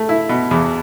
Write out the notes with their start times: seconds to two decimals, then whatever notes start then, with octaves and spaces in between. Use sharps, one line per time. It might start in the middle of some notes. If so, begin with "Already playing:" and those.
Already playing: A3
0.09 E4
0.29 B2
0.51 E2